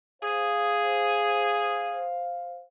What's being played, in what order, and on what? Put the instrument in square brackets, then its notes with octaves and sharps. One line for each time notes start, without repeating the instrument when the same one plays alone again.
[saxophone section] G#4 [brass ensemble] C5 F5